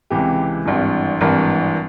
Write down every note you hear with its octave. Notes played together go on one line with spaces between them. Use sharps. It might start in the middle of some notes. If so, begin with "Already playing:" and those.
C#2 C3 E3 G4
G#1 G2 E3
G#1 G2 E3 A#4